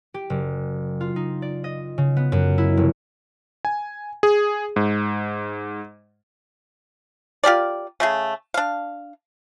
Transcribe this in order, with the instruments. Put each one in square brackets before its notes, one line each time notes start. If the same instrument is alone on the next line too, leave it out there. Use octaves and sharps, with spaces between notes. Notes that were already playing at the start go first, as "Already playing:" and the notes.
[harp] G4
F#1
F4
D#4
D5
D#5
C#3
B3
F#2
E4
F1
[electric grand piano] G#5
G#4
G#2
[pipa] F4 G4 A#4 D5
C#3 A3 G#4
D4 F5